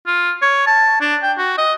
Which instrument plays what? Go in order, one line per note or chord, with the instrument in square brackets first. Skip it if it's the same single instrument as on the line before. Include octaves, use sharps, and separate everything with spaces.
[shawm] F4
C#5
A5
D4
G5
F#4
D#5